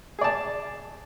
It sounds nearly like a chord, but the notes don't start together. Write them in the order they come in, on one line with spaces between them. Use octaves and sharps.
G#4 D5 A5